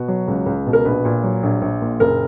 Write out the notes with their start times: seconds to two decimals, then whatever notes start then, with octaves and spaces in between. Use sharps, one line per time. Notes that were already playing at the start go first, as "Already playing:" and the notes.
Already playing: B2 F#4
0.08 F#3
0.28 C#2
0.46 C#2
0.67 B2
0.73 A#4
0.85 A#1 B4
1.05 A#2
1.24 F#3
1.43 A#1
1.62 A#1
1.82 A#2
2.00 F#1 A#4